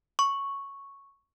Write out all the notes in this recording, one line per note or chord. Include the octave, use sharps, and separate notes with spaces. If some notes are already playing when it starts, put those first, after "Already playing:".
C#6